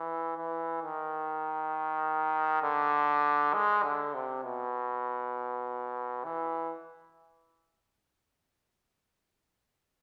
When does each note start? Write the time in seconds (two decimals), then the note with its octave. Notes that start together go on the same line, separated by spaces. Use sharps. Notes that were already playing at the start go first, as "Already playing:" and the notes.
Already playing: E3
0.37 E3
0.82 D#3
2.63 D3
3.54 G#3
3.83 D3
4.14 C3
4.44 B2
6.24 E3